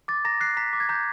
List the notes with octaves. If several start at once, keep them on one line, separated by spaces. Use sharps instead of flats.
D6 A6
A#5 A#6
F#6 C7
A#5 B6
D6
G#6
A#5 G6